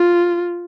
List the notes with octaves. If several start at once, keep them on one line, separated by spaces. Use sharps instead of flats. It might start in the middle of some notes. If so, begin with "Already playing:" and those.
Already playing: F4